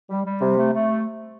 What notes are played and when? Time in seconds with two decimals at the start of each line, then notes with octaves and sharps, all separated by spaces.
0.10 G3
0.25 G3
0.41 C3
0.55 A3
0.72 A3